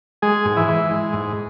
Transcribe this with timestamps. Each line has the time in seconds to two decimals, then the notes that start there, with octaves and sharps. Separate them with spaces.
0.22 G#3 G#4
0.45 G#2
0.57 E3 E4
0.68 E3
0.91 G#3
1.13 G#2